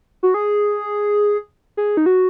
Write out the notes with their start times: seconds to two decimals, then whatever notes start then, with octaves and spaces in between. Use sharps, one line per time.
0.23 F#4
0.34 G#4
1.77 G#4
1.97 D#4
2.06 F#4